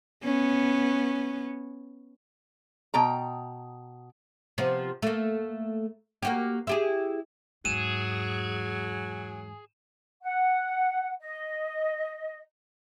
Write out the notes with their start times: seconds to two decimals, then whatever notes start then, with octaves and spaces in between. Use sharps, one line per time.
0.23 B3 C#4
2.94 B2 G5 A#5
4.58 C3 F3 B3
5.02 A3 A#3
6.23 A#3 F#4 G4
6.67 E4 G4 G#4
7.65 E2 G#2 F#3 G#4 D#7 E7
10.23 F#5
11.20 D#5